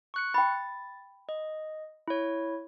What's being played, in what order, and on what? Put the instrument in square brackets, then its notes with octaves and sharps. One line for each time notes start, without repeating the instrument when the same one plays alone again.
[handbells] C#6 F#6 C#7
[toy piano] G5 B5 [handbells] A6
[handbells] D#5
E4 C#5